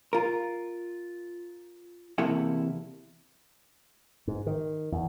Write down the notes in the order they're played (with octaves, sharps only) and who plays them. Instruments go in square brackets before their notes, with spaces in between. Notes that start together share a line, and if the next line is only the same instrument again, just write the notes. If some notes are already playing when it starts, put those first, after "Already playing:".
[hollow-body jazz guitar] F4 A#4
E2 C3 A#3 E4 A4 F#5
[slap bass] G#2
D#3
E2